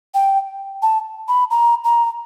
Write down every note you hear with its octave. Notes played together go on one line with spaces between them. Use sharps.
G5
A5
B5
A#5
A#5